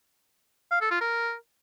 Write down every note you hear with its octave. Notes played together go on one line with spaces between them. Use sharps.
F5
A4
F4
A#4